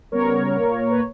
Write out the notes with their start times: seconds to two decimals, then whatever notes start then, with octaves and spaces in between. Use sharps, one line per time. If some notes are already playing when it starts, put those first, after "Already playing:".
0.12 C#3 G3 B3 A#4 C#5
0.55 A#2 A#3
0.90 B4